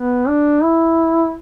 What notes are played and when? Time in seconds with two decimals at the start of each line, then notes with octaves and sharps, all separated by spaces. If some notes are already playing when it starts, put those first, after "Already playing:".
Already playing: B3
0.28 D4
0.63 E4